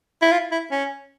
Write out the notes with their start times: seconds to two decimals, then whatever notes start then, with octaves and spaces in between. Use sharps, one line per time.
0.22 E4
0.31 F4
0.51 E4
0.71 C#4